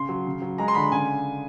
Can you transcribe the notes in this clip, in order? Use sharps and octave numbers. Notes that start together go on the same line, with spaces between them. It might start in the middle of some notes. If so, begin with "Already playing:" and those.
Already playing: C#3 C6
F#3
C#3
F#3
G#3 A#5
C6
D3 B5
C#3 G#5